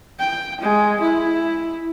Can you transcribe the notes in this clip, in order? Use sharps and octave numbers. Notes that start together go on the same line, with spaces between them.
G5
G#3
E4